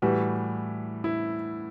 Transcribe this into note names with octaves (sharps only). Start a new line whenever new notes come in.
A2 E3 G3 F#4
E4